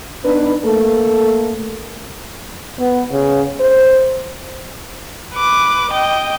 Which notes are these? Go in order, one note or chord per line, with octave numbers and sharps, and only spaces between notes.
B3 D4 D#4 B4
A3 A#3 A4
B3
C#3
C5
B4 D6
D#5 G5